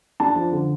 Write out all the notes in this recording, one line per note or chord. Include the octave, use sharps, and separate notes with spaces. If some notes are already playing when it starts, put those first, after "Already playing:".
D4 A5
F3
D3